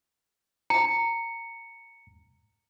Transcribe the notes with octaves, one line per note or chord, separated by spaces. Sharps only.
A#5 C#7